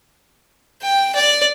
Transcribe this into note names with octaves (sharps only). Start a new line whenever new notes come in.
G5
D5